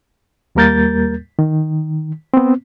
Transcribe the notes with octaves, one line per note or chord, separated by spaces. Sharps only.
D#2 G3 A#3 A#4 G6 A6
D#3
B3 C4